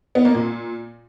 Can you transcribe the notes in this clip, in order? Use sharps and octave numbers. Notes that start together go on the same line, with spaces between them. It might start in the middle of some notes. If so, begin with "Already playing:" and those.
B3
A#3
A#2